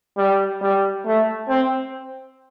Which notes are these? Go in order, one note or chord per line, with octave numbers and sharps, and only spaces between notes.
G3
G3
A3
C4